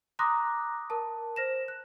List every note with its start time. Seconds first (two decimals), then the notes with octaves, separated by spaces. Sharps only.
0.19 A#5 C6 D6 D#6 F#6 A#6
0.90 A#4 A5
1.36 C5 A#6 E7
1.68 F#6